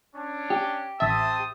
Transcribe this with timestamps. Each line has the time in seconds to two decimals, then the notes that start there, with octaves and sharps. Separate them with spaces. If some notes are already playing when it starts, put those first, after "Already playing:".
0.16 C#4 D4
0.50 G4
1.00 A1 C4 C5 E5 A5 D#6